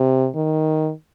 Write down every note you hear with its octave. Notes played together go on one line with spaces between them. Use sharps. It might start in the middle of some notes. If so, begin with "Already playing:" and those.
Already playing: C3
D#3